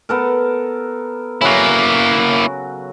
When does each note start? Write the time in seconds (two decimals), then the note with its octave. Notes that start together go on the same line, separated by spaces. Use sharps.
0.09 B3 A4 A#4
1.41 C#3 F#3 A#3 E4 F#4